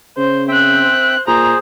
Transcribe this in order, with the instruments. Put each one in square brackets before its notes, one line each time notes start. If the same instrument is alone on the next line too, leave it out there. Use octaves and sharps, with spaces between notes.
[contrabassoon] C#3 [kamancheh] C5
[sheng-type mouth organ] C4 E5 G5 [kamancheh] C5 F#6
[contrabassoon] A#2 [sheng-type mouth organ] G#4 C5 [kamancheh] A#5